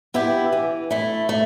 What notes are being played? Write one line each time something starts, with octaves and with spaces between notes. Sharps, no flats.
B3 E4 G4
E3
A3 E4
A3